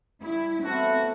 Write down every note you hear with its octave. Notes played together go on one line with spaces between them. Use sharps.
G2 E4
E3 A3 B3 C4 F#4 A4